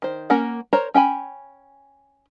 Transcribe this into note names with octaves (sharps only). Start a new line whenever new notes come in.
D#3 C5
A#3 C#4 A#4 F#5
A#4 C5 C#5 A#5
C#4 G5 G#5 B5